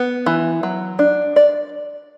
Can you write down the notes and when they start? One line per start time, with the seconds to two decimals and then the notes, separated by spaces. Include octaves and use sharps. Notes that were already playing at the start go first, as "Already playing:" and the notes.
Already playing: B3
0.26 E3
0.63 F#3
0.99 D4
1.36 D5